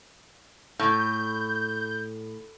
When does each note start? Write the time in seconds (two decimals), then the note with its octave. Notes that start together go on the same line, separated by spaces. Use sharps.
0.79 A2 G6